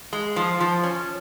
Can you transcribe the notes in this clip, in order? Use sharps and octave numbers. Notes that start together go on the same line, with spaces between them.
G#3
F3
F3
C#4